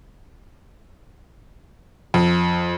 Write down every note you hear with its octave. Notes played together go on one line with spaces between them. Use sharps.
F2